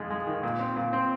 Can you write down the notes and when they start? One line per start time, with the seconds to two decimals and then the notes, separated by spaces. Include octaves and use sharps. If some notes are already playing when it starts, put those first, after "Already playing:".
Already playing: F2 G#3
0.10 G#3
0.27 D#3
0.43 A#2
0.59 C4
0.76 A#2
0.93 C4